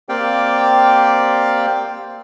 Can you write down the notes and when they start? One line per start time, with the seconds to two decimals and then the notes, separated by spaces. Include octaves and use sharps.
0.09 A#3 C4 G4 D5 F5 G5